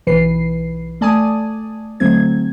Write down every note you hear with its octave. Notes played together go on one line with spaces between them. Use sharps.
B1 E3 B4 C7
A3 D5 G#5 A5 D#6
D2 F#3 A3 C4 G#6